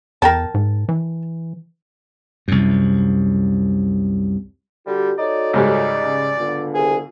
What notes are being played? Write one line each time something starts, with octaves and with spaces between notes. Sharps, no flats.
E2 A#4 G5 A5
G#2
E3
C2 F#2
D3 G3 F#4 G4
D#4 F#4 A4 C#5 D5
C#2 G#2 G3 D5
C#3
D3 B3 F4
C2 G#4